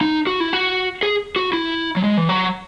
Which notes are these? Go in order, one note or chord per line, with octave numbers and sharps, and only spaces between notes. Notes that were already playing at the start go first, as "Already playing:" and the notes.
D#4
F#4
E4
F#4
G#4
F#4
E4
F#3
G#3
E3
F#3